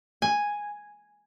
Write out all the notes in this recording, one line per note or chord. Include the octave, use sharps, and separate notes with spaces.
G#5